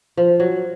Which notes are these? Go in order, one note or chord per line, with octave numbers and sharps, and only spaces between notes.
F3
F#3